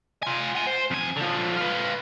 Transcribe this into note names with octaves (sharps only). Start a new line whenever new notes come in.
F4 G#5
F#5 G#5
C5
F2 G#5
D3 F3
F4 B4